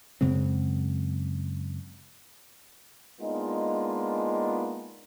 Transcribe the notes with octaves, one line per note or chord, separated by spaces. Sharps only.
F#2 C#3 G#3 C4
G#3 A#3 B3 D4 D#4 F4